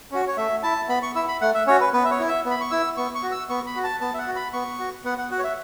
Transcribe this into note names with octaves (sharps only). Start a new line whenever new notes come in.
C#4 F#4
C#5
A3 E5
E4 A5
B3 B5
C#6
E4 E6
B5
A3 F#5
E5
C#4 F#4 C#5
B4
B3 B4
E5
C#5
E4
E5
B3
B5
C#6
E4 E6
B3 C#6
C#6
F#4
E6
B3 C#6
B5
F#4
A5
B3 A5
E5
F#5
F#4
B5
B3 C#6
F#4
B3 F#5
F#5
F#4 F#5
C#5
E5